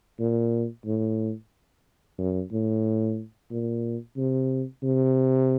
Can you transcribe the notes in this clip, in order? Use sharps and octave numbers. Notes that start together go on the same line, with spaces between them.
A#2
A2
F#2
A2
A#2
C3
C3